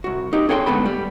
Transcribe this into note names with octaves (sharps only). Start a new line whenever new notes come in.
C2 F#4
D#4 G4
C#4 G#4 A4 F#5 G5 C6
D2 G#2 B3 A4 B5
G3